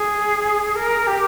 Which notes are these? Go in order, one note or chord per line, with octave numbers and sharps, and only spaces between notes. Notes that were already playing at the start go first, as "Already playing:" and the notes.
Already playing: G#4
A#4
G4